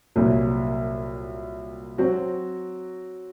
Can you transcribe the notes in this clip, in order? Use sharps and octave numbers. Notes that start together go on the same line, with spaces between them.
C2 A#2 F#3 A#3
F#3 C4 F#4